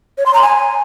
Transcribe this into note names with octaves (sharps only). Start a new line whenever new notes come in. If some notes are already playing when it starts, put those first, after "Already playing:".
C#5
C6
A#5
G#5